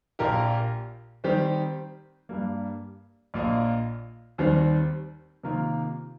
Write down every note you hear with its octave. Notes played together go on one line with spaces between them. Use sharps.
A#1 A#2 A#3 G4 A#4
D#3 G3 C4 G4 C5
G2 G3 A#3
A#1 A#2 A#3 F4 D#5
D#2 D#3 G3 C4
C3 D#3 A#3 F4 A#4